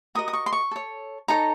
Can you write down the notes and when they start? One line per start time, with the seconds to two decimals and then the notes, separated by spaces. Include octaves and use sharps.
0.15 F#4 A#4 D#5 D#6
0.28 D#6
0.33 C#6
0.46 C6
0.53 C#6
0.71 A4 C#5
1.28 D#4 A4 C#5 A#5